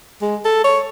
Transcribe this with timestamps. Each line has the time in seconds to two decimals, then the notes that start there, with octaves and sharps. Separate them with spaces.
0.22 G#3
0.45 A4
0.64 C#5